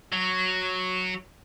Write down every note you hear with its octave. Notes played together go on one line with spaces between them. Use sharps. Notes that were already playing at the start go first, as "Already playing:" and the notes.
F#3